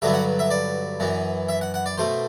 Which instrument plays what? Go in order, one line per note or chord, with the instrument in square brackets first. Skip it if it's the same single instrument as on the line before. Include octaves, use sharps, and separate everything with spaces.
[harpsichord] G2 D3 F#3 B3 E5
F#5
E5
D5
F#2 E3 B3
E5
F#5
F#5
D5
B2 A3 C5